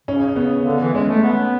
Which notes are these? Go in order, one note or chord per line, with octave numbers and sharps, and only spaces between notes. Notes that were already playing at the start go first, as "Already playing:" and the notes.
C#3 C#4
B3
D3
E3
G#3 C#4
A3
B3